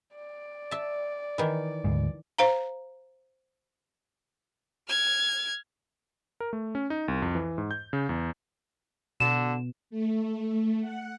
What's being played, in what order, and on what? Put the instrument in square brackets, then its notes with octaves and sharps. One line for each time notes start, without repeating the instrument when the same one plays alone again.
[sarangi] D5
[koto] E5 A5
D#3 E3
[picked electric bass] D2 G#2
[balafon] C5 F5 A#5
[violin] F6 G#6
[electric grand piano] A#4
A3
C#4
D#4
C2
F2
E3
G#2
G6
C#3
E2
[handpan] B2 [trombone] D3 [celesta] E7
[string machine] A3
F#5